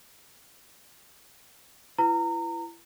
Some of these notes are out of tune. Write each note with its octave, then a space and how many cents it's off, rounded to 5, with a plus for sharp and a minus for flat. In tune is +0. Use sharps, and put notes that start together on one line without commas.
E4 +35 B4 +20 A#5 -25